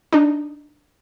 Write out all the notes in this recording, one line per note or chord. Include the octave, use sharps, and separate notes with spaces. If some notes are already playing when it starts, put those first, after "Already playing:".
D4 D#4